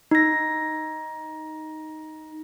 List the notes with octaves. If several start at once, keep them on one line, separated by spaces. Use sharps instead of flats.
D#4 A#6